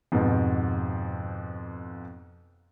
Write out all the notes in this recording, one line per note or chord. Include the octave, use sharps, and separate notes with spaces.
F2 G#2 B2 B3